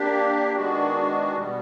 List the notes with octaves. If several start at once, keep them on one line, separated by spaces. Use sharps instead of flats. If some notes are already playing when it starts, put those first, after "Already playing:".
Already playing: A#3 D4 G4
D#3 G#3 B3 D4 F#4
B2 G3 B3